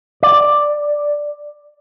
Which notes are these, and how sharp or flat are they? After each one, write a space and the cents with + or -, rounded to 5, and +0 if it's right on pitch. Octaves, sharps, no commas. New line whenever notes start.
D5 +5